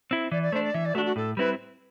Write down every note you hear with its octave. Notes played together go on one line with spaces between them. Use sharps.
C4 E4
E3 D5
D5
A3 D4 C5
D5
E3 E5
D5
A3 D4 F#4
F#4
A2 A4
G3 C4 E4 B4